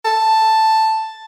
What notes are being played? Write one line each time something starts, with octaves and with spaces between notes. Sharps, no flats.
A5